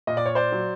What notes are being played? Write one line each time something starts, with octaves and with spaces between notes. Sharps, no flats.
A#2 D#5
D5
C#5
C5 D5
F#3